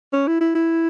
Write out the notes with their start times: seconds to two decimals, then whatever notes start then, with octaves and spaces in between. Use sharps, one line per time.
0.13 C#4
0.27 E4
0.41 E4
0.55 E4